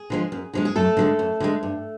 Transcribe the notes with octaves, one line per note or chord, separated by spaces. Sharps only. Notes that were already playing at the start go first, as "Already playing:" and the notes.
Already playing: G#4
D3 F3 G#3
F#2
D3 F3 G#3
G#4
F#2 A3 A4
D3 F3 G#3
F#2
D3 F3 G#3
G2